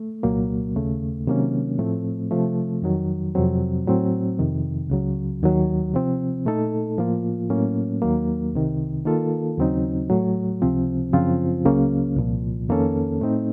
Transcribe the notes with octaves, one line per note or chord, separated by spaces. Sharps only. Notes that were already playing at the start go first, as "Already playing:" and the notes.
Already playing: A3
C2 A#2 F#3 A#3
D#2 C#3 A3
C3 D#3 F#3 A#3 C#4
A2 F3 A3 C4
C3 F3 A3
F2 D#3 F#3
F2 C3 F#3 C4
A2 F#3 C4
F2 C3 D#3
C#2 C#3 F#3
D#2 D#3 F#3
C3 F3 C4
A#2 A3 D#4 A4
A2 F3 A#3 F4
A2 F#3 A#3 C#4
D#2 D#3 F#3 A#3
C2 C3 D#3
D#3 A#3 F4 A4
D#2 C#3 F#3 C4 D#4
A2 F#3 A3
C#2 C3 F3 C4
F#2 C#3 F3 C4 F4
C#2 C#3 F#3 A#3 C#4
C2 A#2 F3
F2 D#3 A#3 C#4 A4
A2 A3 C4 D#4